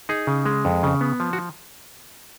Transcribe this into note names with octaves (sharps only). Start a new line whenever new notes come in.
D#4 G#4
C#3
G#3
F2
C#3
B3
F3
F#4